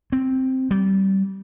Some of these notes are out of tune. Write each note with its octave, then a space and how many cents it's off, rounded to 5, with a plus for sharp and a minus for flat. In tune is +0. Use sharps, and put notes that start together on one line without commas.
C4 +0
G3 -25